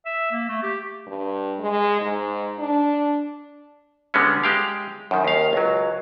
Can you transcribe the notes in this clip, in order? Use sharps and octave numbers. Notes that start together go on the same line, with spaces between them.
E5
A#3
A3
G4
G2
G#3
G#2
D4
D3 G3 G#3 B3 C#4
G#3 G4 F5
F#2 D#3
D#2 F5
C#2 F#3